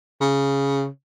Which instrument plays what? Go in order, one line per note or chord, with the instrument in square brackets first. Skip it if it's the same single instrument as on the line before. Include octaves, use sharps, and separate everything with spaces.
[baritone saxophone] C#3